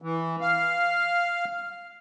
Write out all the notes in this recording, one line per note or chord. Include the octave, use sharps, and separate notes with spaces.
E3
F5